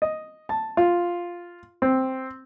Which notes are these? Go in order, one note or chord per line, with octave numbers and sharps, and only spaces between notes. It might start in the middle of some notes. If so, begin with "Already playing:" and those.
D#5
A5
F4
C4